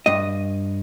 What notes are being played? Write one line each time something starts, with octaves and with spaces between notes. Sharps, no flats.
G2 D#5